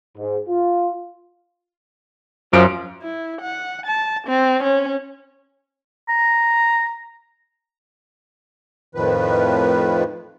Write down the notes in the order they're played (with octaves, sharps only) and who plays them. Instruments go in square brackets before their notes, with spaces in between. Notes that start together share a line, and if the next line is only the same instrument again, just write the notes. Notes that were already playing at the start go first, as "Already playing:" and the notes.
[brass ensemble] G#2
F4
[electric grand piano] F#2 D7 [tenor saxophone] F3
[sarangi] E4
F#5
A5
C4
C#4
[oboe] A#5
[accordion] F2 A2 D#3 F3 B4